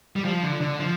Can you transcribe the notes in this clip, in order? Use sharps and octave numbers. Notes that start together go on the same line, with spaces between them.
G3
F3
D3
D3
F3